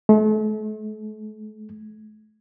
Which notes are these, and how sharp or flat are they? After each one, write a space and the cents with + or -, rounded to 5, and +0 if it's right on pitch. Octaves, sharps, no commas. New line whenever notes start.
A3 -40